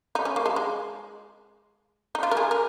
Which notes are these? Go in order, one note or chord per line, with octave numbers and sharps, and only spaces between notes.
D#4
C#4
A#3
G#3
G#3
D#4
F4
A#4
G#4
A#4